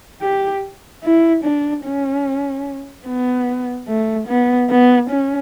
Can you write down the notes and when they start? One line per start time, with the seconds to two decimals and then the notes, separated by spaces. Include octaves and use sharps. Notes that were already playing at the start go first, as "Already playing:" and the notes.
0.22 G4
1.04 E4
1.44 D4
1.85 C#4
3.06 B3
3.88 A3
4.28 B3
4.70 B3
5.10 C#4